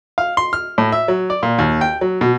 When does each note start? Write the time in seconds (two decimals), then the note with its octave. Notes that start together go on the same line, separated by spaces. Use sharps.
0.18 F5
0.37 C6
0.53 F6
0.78 A2
0.92 E5
1.08 F#3
1.30 D5
1.43 A#2
1.58 D#2
1.81 G5
2.01 F#3
2.21 B2